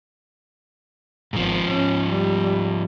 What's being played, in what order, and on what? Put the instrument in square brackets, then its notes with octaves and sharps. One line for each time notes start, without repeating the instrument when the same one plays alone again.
[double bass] G#1 [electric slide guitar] G#2 F3
[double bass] C#4
G3